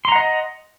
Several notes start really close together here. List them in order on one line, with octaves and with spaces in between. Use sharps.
C6 A#5 F#5 D#5